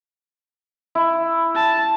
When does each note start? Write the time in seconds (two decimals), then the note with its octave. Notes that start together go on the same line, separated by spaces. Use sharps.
0.95 E4
1.55 A5